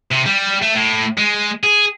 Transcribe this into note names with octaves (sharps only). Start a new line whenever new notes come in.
C3
G3
A3
A2
G#3
G#4